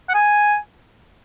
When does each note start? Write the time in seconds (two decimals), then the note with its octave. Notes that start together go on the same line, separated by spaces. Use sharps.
0.09 F#5
0.14 G#5